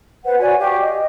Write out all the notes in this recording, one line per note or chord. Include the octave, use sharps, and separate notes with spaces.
B4 C5 F#5
F#4 C#5 D5 G#5
G4 F5 C#6 D6
D#5